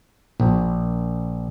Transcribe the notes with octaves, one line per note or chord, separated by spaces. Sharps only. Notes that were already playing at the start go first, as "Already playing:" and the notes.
A#1